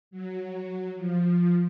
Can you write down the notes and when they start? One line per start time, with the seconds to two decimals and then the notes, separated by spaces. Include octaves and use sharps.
0.11 F#3
0.96 F3